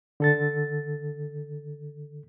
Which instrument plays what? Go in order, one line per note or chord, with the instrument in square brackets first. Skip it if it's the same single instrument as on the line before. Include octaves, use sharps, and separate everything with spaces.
[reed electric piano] D3 A4 A6